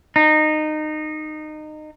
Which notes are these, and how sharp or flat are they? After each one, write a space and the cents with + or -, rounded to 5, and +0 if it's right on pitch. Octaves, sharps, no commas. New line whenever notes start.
D#4 -20